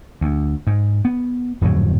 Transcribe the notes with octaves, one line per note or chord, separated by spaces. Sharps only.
D2
G#2
B3
D1 F2 G#2 F#3